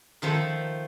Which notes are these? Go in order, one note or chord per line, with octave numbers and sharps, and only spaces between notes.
D#3 F3 A3